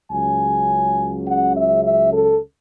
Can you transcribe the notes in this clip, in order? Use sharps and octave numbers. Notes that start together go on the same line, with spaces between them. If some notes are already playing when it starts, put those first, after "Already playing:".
C#2 C#3 F#3 C#4 G#5
F#5
E5
E5
A4